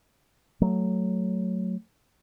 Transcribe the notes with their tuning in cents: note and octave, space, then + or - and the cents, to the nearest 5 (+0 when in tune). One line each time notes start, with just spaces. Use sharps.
F#3 +0 A3 +0